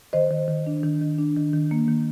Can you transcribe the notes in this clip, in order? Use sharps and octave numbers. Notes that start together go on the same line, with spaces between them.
D#3 C5 D#5
D#3
D#3
D4
D#3
D#3
D4
D#3
D#3
A#3
D#3